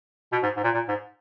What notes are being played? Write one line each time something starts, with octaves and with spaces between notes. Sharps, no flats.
B2
G#2
G#2
A#2
A#2
G#2